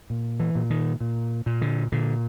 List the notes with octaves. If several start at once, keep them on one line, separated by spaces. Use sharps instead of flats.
A#2
E3
A#2
D#3
A#2
A#2
D3
A#2 D3